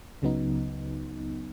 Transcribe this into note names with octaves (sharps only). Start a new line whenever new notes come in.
C#2 C#3 F#3 B3 D#4